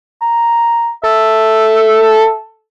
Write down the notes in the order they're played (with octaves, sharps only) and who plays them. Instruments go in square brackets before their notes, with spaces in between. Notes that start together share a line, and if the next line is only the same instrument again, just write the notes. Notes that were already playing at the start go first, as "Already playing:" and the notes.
[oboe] A#5
[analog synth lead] A4 [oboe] E5